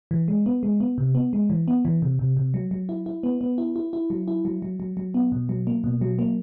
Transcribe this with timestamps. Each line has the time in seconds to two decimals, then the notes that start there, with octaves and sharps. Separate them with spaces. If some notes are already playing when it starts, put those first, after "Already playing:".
0.11 E3
0.28 G#3
0.46 B3
0.63 G#3
0.80 B3
0.98 C3
1.15 B3
1.33 G#3
1.50 E3
1.68 B3
1.85 E3
2.02 C3
2.19 C3
2.37 C3
2.54 F#3
2.71 F#3
2.89 E4
3.06 E4
3.23 B3
3.41 B3
3.58 E4
3.76 E4
3.93 E4
4.10 F#3
4.28 E4
4.45 F#3
4.62 F#3
4.80 F#3
4.97 F#3
5.14 B3
5.32 B2
5.49 F#3
5.67 A#3
5.84 B2
6.01 F#3
6.19 A#3